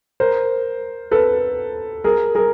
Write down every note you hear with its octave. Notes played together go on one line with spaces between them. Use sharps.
A#4 C5
A4 B4
G#4 A#4
G#4 A#4